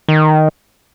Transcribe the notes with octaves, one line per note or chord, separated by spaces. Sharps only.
D#3